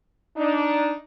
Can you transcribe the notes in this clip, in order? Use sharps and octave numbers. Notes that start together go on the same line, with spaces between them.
D4 D#4